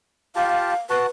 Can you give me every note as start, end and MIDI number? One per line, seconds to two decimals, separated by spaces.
0.36 0.74 65
0.36 0.74 67
0.36 0.78 77
0.36 0.74 81
0.90 1.06 66
0.90 1.05 71
0.90 1.06 78
0.90 1.06 81